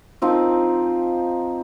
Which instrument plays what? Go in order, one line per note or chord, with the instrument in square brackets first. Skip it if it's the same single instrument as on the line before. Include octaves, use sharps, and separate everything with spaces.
[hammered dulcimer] F3 C4 D#4